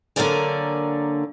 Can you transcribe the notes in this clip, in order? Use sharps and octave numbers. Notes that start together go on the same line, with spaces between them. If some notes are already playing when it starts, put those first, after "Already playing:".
D3 F#3 A#3 A#4 D5 G#5